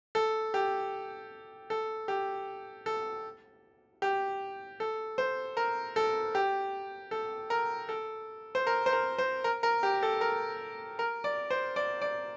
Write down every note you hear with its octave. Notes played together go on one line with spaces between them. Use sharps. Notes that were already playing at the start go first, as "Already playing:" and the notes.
A4
G4
A4
G4
A4
G4
A4
C5
A#4
A4
G4
A4
A#4
A4
C5
A#4
C5
A#4
C5
A#4
A#4
G4
A4
A#4
A#4
D5
C5
D5
D5